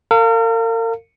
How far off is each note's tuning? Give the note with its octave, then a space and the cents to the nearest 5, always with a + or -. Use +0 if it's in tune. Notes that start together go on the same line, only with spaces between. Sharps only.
A#4 -40 F5 +0